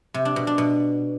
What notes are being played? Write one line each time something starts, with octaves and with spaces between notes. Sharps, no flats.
C3
D4
B2
D4
B2